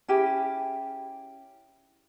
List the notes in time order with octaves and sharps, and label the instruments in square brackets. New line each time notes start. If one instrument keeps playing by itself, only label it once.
[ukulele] C#4 E4 G4 G#4